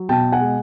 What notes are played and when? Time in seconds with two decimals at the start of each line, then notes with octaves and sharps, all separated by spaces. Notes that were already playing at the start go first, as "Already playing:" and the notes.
Already playing: F#3
0.09 B2 G5 A5
0.32 F#5 G#5
0.40 G#3